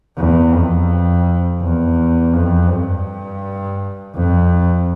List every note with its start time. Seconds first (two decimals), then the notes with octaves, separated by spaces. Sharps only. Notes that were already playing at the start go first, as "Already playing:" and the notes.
0.17 E2
0.53 F2
1.61 E2
2.34 F2
2.70 G2
4.15 F2